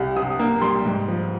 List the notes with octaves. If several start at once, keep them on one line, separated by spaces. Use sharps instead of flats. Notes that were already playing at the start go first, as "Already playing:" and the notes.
Already playing: C2
C3 D#6
A#3
G3 C6
G#2
F3